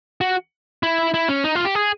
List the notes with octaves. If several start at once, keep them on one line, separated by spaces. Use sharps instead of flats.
F#4
E4
E4
C#4
D#4
F4
G4
G#4